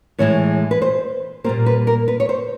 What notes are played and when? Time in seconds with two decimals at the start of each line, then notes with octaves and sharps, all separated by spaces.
0.18 A2 E3 G#3 C#5
0.71 B4
0.82 C5
1.44 A#2 G3 A#3 C5
1.66 B4
1.87 A#4
2.08 B4
2.20 C#5
2.29 C5